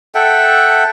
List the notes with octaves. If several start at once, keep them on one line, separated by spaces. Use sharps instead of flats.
A4 E5 F#5 G5